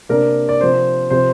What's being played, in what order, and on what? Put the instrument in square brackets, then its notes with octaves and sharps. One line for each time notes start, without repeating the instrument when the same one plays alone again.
[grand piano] C3 A#3 D4 A#4 D5
D5
C3 F3 C4 C5
C3 F3 C4 C5